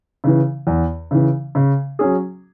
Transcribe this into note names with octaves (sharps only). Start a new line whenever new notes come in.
C#3 E3
E2
C#3 E3
C#3
F#3 C#4 G#4